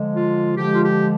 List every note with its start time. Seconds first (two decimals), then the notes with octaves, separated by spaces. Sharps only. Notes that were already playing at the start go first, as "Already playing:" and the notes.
Already playing: D3 F3 G#3
0.15 F4
0.57 D3 F3 G#3 G4
0.74 F4
0.84 G4